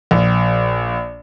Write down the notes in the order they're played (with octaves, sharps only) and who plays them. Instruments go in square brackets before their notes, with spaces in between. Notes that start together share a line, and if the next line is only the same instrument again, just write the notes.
[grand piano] A#1